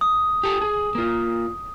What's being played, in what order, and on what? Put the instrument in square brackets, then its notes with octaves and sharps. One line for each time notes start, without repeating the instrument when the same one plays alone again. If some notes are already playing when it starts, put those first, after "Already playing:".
[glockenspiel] D#6
[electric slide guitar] G4 A4
G#4
A#3 F4